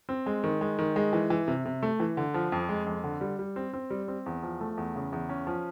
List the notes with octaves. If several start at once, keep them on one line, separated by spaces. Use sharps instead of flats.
C4
G#3
D#3
G#3
D#3
G#3
E3
E3
C3
C3
A3
E3
D3
F3
F2
G#3
F2
D3
G3
G3
C4
C4
G3
C4
E2
F3
A3
E2
C#3
E2
C#4
F3